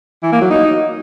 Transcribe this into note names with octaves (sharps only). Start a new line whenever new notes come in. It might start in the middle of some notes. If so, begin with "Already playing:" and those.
E3
A#3
F#3
D#4